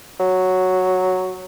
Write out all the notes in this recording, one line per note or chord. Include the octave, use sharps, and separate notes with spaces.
F#3